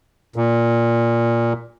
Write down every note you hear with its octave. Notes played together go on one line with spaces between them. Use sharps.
A#2